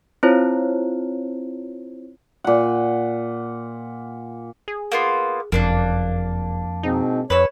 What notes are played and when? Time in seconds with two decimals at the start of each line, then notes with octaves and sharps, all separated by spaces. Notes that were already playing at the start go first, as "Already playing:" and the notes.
0.23 C4 E4 F4 C5 C#5
2.44 A#2 F#5
4.68 G#4
4.92 A#3 B3 F4
5.52 F#1 F2 A#3 D4 F#6
6.83 G#2 B2 C4 D#4
7.30 F2 B4 C#5 E6